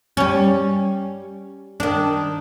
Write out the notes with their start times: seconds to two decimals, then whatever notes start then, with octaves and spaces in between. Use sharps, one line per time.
0.17 G3 C#4
1.80 D#3 D4